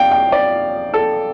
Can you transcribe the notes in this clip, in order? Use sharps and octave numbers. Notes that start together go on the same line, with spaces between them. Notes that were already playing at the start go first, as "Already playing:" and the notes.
Already playing: F2 C3 D5 F5 G5
G5
D5
A4